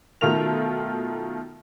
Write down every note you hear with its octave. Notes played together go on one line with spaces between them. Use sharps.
B2 D#3 A3 F4 A#4 F7